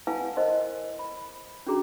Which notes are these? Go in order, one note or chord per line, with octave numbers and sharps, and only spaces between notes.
E4 B4 F5 F#5 G#5 A5
A#4 C5 D#5 C6
B5
C#4 D4 F#4 G#4 A#5